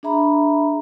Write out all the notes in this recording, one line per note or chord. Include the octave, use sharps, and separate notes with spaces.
D4 G#4 E5 A#5 B5